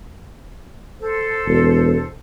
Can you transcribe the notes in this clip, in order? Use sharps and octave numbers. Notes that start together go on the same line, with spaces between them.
A4 C5
E1